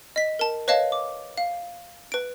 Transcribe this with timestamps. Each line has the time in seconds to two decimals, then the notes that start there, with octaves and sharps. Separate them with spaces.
0.16 D#5 B6
0.39 A#4 A5
0.68 B4 C#5 D#5 F5 A5
0.92 D6
1.38 F5
2.12 B4 D7